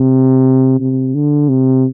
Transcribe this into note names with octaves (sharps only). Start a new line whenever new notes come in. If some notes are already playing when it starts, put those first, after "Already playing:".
Already playing: C3
C3
D3
C3